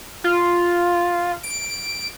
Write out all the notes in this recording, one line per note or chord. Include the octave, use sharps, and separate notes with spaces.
F4
D7